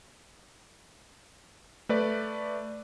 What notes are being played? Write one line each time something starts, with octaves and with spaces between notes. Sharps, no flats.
A3 B4 D5